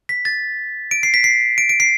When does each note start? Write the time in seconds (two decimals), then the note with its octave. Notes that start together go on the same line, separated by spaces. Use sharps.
0.09 B6
0.25 A6
0.91 D7
1.03 C7
1.14 B6
1.24 C7
1.58 D7
1.69 D7
1.80 C7